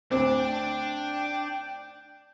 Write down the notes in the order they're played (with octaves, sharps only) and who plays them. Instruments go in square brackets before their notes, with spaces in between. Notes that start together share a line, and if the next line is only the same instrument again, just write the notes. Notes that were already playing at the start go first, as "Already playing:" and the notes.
[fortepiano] D2 C4 [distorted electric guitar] D4 D5
[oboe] G5